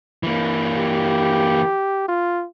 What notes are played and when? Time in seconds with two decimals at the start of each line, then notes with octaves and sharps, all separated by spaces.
0.23 E3 A#3
0.77 G4
2.08 F4